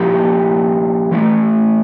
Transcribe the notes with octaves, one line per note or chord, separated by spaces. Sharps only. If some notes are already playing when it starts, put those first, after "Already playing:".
Already playing: A#2 F3 A#3 E4 G4
E3 A3 E4